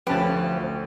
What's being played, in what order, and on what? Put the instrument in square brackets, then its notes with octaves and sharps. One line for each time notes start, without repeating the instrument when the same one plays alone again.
[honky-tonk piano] D2 A3 C#4 [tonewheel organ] F3 [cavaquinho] G4 [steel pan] B4 A5